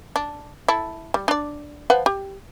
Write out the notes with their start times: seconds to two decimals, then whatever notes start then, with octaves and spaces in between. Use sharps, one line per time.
0.16 D4
0.68 E4 A4
1.14 G3
1.28 D4 D5
1.90 F3 B4 F#5
2.06 G4